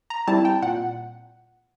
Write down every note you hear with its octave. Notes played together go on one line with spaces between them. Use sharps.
A#5
G3 C4 E4 A5
G5
A#2 F#5